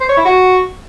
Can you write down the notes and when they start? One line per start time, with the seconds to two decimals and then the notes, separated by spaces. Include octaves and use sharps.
0.01 C5
0.09 C#5
0.17 E4
0.25 F#4